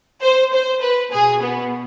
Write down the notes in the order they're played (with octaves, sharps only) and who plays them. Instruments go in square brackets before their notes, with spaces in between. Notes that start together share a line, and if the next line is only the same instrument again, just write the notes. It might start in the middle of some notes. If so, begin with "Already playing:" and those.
[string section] C5
C5
B4
B2 G#4
B3